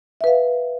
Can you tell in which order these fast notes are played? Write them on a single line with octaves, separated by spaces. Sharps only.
E5 B4 F5